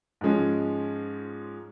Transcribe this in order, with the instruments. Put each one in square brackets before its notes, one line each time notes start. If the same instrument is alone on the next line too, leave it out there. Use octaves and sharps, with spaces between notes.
[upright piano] G#2 F3 G#3 C#4